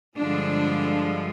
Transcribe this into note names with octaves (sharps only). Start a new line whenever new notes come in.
G2 D3 F3 G#3 D4